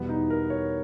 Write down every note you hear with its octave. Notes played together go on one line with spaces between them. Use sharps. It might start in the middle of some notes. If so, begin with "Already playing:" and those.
Already playing: E2 B2 G3 B3
D#4
A#4
C#5